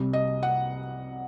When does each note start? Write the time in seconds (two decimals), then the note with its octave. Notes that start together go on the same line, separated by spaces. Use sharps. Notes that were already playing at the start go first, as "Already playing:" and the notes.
Already playing: C2 C3 G3
0.13 D#5
0.43 F#5